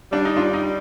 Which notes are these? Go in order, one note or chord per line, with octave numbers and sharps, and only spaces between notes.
G3 D4
D#4
D4 F4
D#4